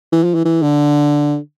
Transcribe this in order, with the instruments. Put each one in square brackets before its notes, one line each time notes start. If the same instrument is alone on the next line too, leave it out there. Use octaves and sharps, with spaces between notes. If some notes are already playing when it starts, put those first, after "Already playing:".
[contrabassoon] E3
F3
E3
E3
D3